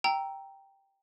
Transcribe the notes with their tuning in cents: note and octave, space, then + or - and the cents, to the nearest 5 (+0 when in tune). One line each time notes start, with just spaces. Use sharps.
G5 +0 A#5 +0 E6 +0